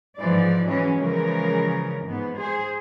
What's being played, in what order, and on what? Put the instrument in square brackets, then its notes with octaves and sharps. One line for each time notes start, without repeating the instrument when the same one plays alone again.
[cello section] G#2 E3 F3 G#3 D5
E3 F#3 G#3 C#4
C#3 E3 F3 G#3 A#4
G#2 B3
G#4 C5